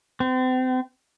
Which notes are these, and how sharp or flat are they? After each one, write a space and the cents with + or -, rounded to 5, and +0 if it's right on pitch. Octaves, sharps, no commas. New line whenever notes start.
C4 -35